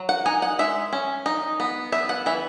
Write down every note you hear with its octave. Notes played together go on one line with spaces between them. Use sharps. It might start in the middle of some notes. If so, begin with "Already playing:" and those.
Already playing: F#3
F#5
D#4 G#5
F#5
G#3 E5
C#4
D#4
B3
B3 E5
F#5
E3 E5